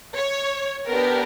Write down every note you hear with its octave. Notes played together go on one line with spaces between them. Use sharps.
C#5
B3 D4 G4 A#4